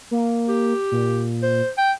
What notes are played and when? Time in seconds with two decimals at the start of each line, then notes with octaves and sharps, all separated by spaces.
0.11 A#3
0.48 G4
0.92 A#2
1.42 C5
1.78 G5